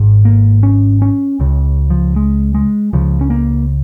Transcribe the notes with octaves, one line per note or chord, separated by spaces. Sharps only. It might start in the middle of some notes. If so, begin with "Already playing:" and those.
Already playing: G#1 G#2
A#3
C#4
C#4
C#2 C#3
F3
G#3
G#3
C#2 C#3 F3
C#4
A#3